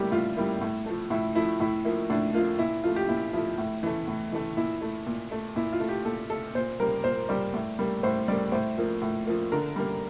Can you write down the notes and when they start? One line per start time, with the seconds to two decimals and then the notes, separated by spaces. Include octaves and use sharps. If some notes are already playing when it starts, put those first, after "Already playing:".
Already playing: A2 G3 A#3 E4 G4
0.11 A2 F4
0.37 G3 A#3 E4
0.61 A2
0.86 F3 A3
1.10 A2 E4
1.35 F3 A3 E4
1.60 A2 E4
1.85 F3 A#3 E4
2.10 A2 D4
2.34 F3 A#3 F4
2.59 A#2 E4
2.84 F3 A3 F4
2.96 G4
3.08 A#2 E4
3.33 F3 A3 E4
3.58 A2
3.83 E3 A3
4.08 A2
4.32 E3 A3
4.57 A#2 E4
4.82 A3
5.07 A#2
5.31 A3
5.56 A#2 E4
5.73 F4
5.80 A3
5.89 G4
6.05 A#2 A4
6.30 A3 A4
6.55 A#2 C5
6.80 G3 A#3 A#4
7.04 A#2 C5
7.29 G3 A#3 D5
7.54 A2
7.79 G3 A#3
8.03 A2 C5
8.28 G3 A#3 D5
8.52 A2 C5
8.78 F3 A#3
9.02 A2
9.27 F3 A#3
9.52 D3 A#4
9.76 G3 A#3